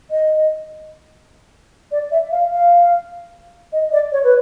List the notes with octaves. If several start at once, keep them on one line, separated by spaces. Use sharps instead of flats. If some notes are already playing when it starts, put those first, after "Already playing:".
D#5
D5
E5
F5
F5
D#5
D5
C#5
B4